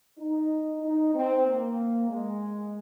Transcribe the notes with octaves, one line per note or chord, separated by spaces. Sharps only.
D#4
D#4
C4
A#3
G#3